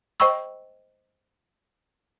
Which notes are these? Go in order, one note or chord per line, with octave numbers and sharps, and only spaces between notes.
C5 D#5 G5 B5 C#6 E6